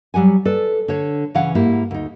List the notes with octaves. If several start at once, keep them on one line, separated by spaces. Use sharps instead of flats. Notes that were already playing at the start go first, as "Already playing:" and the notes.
F#3 G3 F#5 G#5
A4 B4 D5
D3 C#5
C#3 E3 C#4 F5 F#5
G#2 A#3 E4 G4
D2 D#4